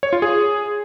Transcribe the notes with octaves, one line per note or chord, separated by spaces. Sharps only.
C#5
F4
G#4